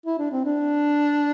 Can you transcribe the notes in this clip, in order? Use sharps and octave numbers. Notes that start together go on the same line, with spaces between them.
E4
D4
C4
D4